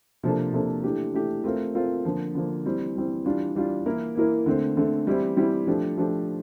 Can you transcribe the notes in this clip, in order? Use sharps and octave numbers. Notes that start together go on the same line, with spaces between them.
C3 F3 A#3 D4 A4
C3 F3 A#3 D4 A4
E3 A3 D4 G4
E3 A3 D4 G4
A3 C4 F4 A#4
A3 C4 F4 A#4
D3 F3 A#3
D3 F3 A#3
E3 G3 C4
E3 G3 C4
E3 G3 D4 F4
E3 G3 D4 F4
E3 A#3 E4 A#4
E3 A#3 E4 A#4
D3 A3 C4
D3 A3 C4
E3 G3 C4 E4 G4
E3 G3 C4 E4 G4
F3 A3 D4 G4
F3 A3 D4 G4